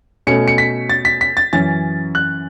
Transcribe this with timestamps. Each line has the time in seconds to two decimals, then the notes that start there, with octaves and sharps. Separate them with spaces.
0.27 B2 A3 C#4 C#7
0.48 C#7
0.58 B6
0.89 A6
1.05 B6
1.21 B6
1.37 A6
1.53 F#2 E3 C#4 A6
2.15 F#6